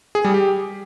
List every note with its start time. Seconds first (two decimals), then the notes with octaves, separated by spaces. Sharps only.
0.15 G#4
0.25 G3
0.34 G4